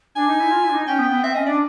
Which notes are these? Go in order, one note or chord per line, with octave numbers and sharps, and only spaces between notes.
D4 G#5
D#4
E4
F4
E4
D4
D#4
C#4 G5
B3
B3
C4 E5
C#4 D#5
D4 D5